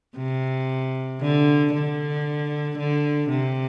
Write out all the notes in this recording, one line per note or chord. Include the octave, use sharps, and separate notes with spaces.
C3
D3
D3
D3
C3